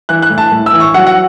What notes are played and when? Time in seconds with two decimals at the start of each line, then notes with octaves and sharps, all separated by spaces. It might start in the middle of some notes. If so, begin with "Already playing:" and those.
0.09 E3 F#6
0.22 F#6
0.30 A2
0.38 A5
0.52 A2
0.66 E6
0.73 E3
0.80 C#6
0.94 F#3 F#5
1.07 F#5